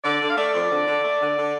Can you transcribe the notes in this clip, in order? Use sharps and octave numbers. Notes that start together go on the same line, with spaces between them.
D3 D5
D3
F5
A3 D5
F2
D3
D3
A3
D3
D3